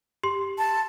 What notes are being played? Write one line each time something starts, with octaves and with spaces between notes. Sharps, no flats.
G4 C6
A5